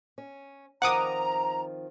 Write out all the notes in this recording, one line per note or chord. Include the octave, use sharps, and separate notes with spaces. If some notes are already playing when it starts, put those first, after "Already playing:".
C#4
D#3 F3 C4 F#5 A#5 D6 D#6